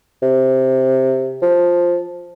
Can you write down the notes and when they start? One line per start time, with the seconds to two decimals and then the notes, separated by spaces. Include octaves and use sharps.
0.23 C3
1.42 F3